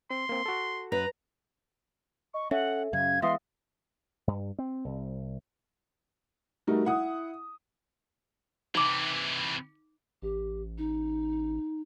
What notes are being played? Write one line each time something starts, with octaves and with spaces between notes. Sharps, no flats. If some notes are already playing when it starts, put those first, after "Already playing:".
C4 C6
A#3 C4
F#4 A4
F#2 F#3 B4 A#5 F#6
D#5 C#6
C#4 A4 E5 F#5
F#2 C#3 F5 G#6
E3 G#3 B3 G#4 E5 F5 C6 D#6
G2
C4
C2
G3 A3 D#4 F#4 A#4
E4 F#5 D#6
C3 E3 D#4 D6
A1 G4
D#4